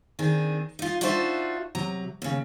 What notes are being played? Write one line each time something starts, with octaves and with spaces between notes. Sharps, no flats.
D#3 C4 D4 G#4
D#4 F4
D4 D#4 F4 F#4 C5 E5
C3 F#3 A#5
D#2 C#3